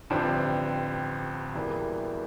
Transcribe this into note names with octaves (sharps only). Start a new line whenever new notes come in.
A1 G2 D3 F3 C4
E1 E2 E3 G3 A#3